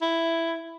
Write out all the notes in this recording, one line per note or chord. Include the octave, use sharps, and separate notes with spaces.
E4